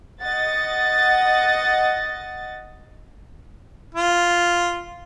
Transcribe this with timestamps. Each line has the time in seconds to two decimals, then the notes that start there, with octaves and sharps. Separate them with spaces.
0.22 D#5 F#5 A6
3.95 F4